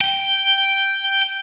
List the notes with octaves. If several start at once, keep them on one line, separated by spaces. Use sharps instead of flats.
G5